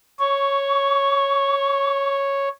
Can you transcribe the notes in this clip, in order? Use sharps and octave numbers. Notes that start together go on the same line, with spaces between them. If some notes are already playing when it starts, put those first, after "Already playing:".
C#5 C#6